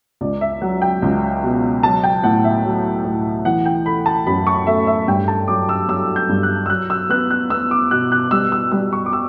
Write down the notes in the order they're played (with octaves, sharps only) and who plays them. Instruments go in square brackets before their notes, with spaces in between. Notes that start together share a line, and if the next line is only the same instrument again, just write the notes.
[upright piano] C#2 D5
E5
F#3 F#5
G5
C#2
B2
F#3 A5
G5
A2 F#5
E5
F#3
A2
E3 F#5
G5
A3 B5
A5
F#2 B5
C#6
A3 E5
E5
G2 G5
A5
F#3 D6
E6
F#3 E6
G6
G2
F#6
E6
F#3 F#6
E6
B3 F#6
F#6
B3 E6
D6
B2 F#6
F#6
G3 E6
E6
G3 E6
C#6
D6
E6